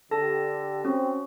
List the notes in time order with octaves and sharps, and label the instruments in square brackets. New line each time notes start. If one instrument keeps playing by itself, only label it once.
[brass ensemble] D3 G4 [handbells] A4 A5 A#6
[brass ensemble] C4 [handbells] C#4 F#4